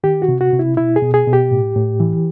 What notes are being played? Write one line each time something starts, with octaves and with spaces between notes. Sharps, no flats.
D#3 G4
F#4
C3
F#4
C3
E4
B2 E4
G#4
B2
G#4
B2
G4
A2
A2
E3